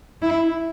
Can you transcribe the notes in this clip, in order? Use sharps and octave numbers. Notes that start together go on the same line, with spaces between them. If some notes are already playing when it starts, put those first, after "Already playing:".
E4